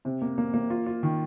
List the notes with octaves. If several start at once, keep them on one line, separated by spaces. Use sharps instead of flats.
C3
A#3
A#3
A#3
F4
F4
D#3